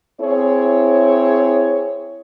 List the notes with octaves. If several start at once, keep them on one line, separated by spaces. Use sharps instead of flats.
C4 E4 G#4 C#5